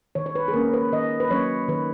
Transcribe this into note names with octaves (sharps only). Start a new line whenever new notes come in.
D#3 C#5
C#5
B4
G#4
A#3 C#4 A#4
B4
D#3 D#5
B4
F#3 A#3 C#4 C#5
D#3 B4